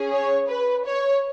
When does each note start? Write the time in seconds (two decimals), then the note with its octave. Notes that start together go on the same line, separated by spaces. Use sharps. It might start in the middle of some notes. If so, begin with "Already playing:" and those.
Already playing: C#4 G#4
0.11 C#5
0.48 B4
0.85 C#5